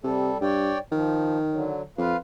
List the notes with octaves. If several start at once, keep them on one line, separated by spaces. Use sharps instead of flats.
C3 G3 A4
G2 C#5 D5 G5
D#3 F3
D3 F#3
F2 F4 B4 F5